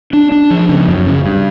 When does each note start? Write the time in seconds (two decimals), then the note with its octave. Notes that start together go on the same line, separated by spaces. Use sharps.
0.13 D4
0.32 D4
0.50 F3
0.69 C#3
0.88 F#2
1.07 C#3
1.25 G2